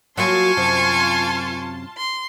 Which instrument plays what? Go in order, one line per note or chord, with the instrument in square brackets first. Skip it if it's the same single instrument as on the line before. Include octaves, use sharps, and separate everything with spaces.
[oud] F#3 A#3 F#4 [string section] F4 A5 C6 [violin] G#5 C#6
[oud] F#2 C3 C5
[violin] C6